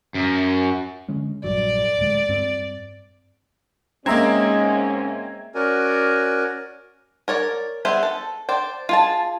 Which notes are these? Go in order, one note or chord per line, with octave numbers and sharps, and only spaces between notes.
F#2
D3 G#3 C#4
A#1 G2 F#3 D5
D1 G#3
G2 C4
G#2 G#3 A#3 C4 C#4 E5 A#5 G#6
C#4 F#4 A#4 D5 G#5
A#4 C#5 D5
G3 B3 G#4 C5 E5
A4
C5 D5 G5
F4 G#4 A5